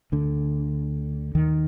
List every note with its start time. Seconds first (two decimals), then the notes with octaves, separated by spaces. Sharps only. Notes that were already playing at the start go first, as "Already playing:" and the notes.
0.12 D2 D3
1.35 D#2 D#3